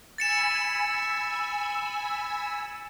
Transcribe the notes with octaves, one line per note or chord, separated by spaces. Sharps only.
G#5 B5 E6 A6 C#7 E7